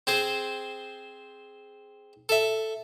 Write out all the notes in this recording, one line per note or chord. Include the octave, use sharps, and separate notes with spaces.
C4 G#4 C5
A4 E5